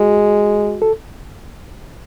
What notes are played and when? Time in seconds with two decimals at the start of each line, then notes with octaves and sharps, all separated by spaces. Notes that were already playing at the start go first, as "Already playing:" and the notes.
Already playing: G#3 F#4
0.82 A4